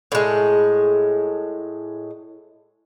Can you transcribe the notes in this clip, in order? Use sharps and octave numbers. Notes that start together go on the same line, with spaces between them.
A2 G#3